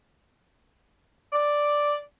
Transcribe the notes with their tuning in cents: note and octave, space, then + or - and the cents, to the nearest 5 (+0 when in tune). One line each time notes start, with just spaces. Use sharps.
D5 +0